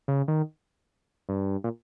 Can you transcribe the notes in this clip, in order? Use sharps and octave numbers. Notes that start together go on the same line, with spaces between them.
C#3
D#3
G2
A#2